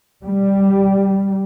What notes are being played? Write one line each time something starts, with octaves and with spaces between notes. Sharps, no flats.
G3